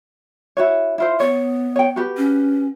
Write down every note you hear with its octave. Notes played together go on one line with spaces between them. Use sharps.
E4 F#4 C#5
E4 F4 C5
B3 C#5
C#5 G5
F#4 G4 B4
C#4